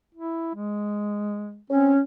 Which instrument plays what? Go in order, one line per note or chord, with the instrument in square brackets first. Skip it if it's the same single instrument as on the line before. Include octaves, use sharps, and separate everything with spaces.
[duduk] E4
G#3
[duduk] C4 [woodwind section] C#4